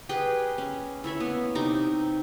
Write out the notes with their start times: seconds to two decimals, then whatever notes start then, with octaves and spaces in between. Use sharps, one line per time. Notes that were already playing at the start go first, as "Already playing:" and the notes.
0.09 G4 G#4 B4 G5
0.58 C#4
1.04 E4 C#5 E5 B5
1.20 A#3 B3
1.55 C3 D#4 G4 D6